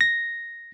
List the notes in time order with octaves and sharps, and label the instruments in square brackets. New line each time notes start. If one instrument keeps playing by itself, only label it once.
[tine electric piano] A#6